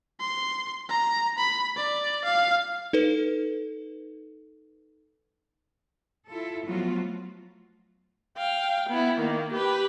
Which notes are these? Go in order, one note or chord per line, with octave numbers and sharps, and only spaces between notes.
C6
A#5
B5
D5
F5
D#4 A4 B4
E4 F4 A4
F3 F#3 A3 B3 F4 F#4
F5 G5
B3 E4
D#3 A#3
G4 B4